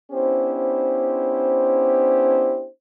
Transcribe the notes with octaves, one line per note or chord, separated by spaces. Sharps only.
B3 C#4 D4 E4 G4 C5